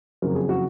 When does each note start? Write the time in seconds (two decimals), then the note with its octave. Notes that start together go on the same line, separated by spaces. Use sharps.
0.22 F#1 F2 C#3 F#3 A#4
0.35 G#4
0.49 F#4